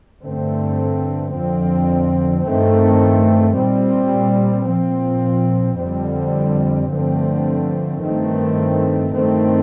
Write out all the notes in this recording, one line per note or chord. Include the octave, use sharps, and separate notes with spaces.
G2 D3 A3 C4
F2 D3 F3 C4
G2 D#3 A3 C4
A#2 G3 C4
A#2 F3 C4
F2 D3 G3 C4
G2 D3 F3 A3 C4
G2 D#3 A3 C4
G2 D#3 A3 C4